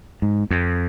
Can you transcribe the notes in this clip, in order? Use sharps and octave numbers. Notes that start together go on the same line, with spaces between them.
G#2
F2